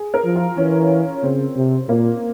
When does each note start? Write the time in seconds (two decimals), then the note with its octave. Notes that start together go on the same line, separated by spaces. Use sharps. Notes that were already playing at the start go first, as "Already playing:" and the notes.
Already playing: G#4
0.14 A#4
0.25 F3
0.35 F4
0.57 E3 C#4
1.23 C#3 C4
1.56 C3
1.88 A#2 A#3